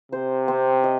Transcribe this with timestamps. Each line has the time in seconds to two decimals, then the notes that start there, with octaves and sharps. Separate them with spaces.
0.12 C3 C5
0.48 C4
0.84 D#5